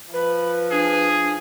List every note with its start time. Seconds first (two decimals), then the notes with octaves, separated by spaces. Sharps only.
0.14 F3 B4 B5
0.71 D4 G#4